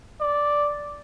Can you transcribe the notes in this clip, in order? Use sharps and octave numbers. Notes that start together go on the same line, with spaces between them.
D5